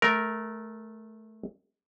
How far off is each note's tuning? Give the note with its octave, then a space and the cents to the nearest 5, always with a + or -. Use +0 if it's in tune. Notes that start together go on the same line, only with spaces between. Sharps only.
A3 -15 A#4 +0